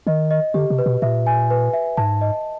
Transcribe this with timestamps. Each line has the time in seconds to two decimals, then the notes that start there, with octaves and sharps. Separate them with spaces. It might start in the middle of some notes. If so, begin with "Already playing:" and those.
0.07 D#3 D#5
0.31 D#5
0.54 D3 G4
0.70 C3
0.78 B4
0.86 B2
1.02 A#2 E5
1.27 G#5
1.50 B4
1.73 E5
1.97 G#2 A5
2.21 D#5